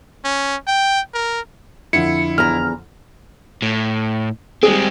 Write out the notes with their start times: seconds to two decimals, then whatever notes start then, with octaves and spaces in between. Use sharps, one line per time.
0.25 C#4
0.67 G5
1.14 A#4
1.93 F2 D3 F3 E4 C#7
2.38 E2 A#5 F6
3.62 A2
4.63 G3 G#3 C4 G#4